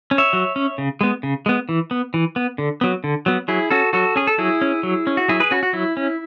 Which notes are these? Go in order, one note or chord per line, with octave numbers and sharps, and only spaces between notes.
C#4
C#5 E5
F#3
C#4
C#3
G#3 B3
C#3
G#3 B3
E3
B3
E3
B3
D3
F#3 B3
D3
F#3 B3
F#3 E4 G#4
C#4 F#4 A4
F#3 F#4 A4
C#4 G#4
A4
F#3 E4 G#4
C#4
F#3
C#4
F#4
F#3 E4 G#4
G#4 B4
C#4 F#4
F#4
F#3 E4
C#4